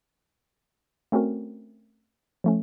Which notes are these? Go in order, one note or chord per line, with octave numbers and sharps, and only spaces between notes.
A3 C4 C#4 F#4 A#4
F3 A3 C#4